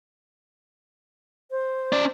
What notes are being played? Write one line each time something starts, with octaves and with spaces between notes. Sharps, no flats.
C5
C#4 D5